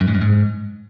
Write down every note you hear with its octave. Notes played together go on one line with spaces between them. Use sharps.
F#2
G#2
F#2
G#2